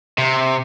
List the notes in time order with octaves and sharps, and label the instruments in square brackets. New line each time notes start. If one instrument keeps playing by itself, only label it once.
[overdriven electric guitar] C3